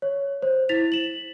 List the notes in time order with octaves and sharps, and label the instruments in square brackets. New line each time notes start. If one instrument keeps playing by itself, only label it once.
[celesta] C#5
C5
E4 A6 B6 F7
E7 F#7